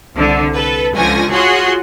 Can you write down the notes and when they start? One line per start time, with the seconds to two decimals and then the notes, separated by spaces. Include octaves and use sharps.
0.15 C2 D3
0.54 A4 B4
0.95 C#2 D3 F3 G#5 C#6 A#6
1.31 F4 F#4 G#4 C#5 F#5 C6